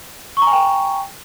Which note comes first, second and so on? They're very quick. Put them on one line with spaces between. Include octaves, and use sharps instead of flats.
C#6 A#5 G#5 G5